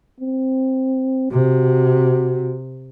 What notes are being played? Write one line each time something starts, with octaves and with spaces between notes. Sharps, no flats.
C4
C3 F#4